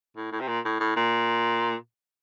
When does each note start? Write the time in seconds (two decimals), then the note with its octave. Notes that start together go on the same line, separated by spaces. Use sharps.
0.16 A2
0.32 A2
0.40 C3
0.48 A#2
0.65 A2
0.80 A2
0.96 A#2